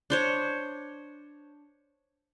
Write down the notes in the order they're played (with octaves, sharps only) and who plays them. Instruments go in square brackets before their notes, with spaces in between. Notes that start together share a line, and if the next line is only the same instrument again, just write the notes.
[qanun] D4 C5 C#5